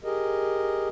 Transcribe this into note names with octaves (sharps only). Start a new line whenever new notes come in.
G4 G#4 A#4 D#5